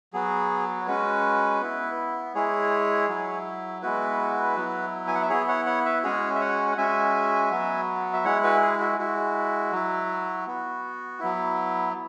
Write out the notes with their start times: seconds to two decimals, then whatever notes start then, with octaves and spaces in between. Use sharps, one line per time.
0.13 F#3 B3 F#4 G#4
0.81 C#5
0.87 G#3 C#4 F#4 B4
1.61 B3 E4
2.35 G#3 E4 G#4 C#5
3.09 F#3 E4
3.82 G#3 B3 E4 F#4 B4
4.56 F#3 B3 E4
5.08 G#5
5.15 F#5
5.22 E5
5.30 B3 E4 G#4 C#5
5.48 C#5 F#5
5.66 C#5 F#5
5.85 B4 E5
6.04 G#3 C#4 F#4 G#4 C#5
6.35 E5
6.41 C#5 F#5
6.72 F#5
6.78 G#3 C#4 F#4 E5 G#5
7.51 F#3 B3 F#4
8.13 E5
8.25 G#3 E4 C#5 F#5
8.43 F#4 B4
8.62 G#4
8.80 F#4
8.99 G#3 E4 F#4
9.72 F#3 E4
10.47 B3 F#4
11.20 F#3 B3 E4